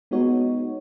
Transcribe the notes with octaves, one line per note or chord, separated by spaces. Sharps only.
G#3 B3 D#4 F#4 C#5